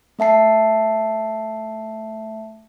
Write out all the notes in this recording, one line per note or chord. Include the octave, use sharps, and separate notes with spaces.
A3 E5 A5 C7